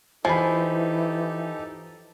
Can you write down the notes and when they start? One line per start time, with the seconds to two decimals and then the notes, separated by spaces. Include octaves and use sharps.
0.25 E3 F3 D#4 G4 A4 G#5 B5